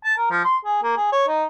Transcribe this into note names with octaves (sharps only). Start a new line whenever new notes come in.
A5
A#4
F3
C6
G#4
A#3
G#4
C#5
D#4